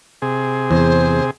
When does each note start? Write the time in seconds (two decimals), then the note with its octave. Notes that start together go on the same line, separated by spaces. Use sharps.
0.22 C3 G#4
0.71 E2 C5